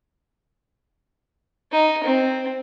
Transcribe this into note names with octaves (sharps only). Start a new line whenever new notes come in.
D#4
C4